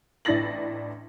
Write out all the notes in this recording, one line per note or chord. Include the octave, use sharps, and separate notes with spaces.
A1 D4 E4 A6 A#6 F#7